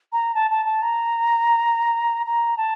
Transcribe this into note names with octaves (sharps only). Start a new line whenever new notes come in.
A#5
A5
A5
A5
A#5
A#5
A5